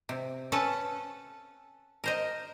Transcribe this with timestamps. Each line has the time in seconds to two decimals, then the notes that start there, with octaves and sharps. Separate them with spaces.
0.09 C3
0.52 C#4 A4 B4 F#5 A5
2.04 A#4 C5 D#5